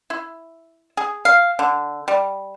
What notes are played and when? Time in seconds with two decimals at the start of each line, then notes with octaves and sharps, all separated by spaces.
0.10 E4
0.97 G#4
1.25 F5
1.59 D3
2.08 G3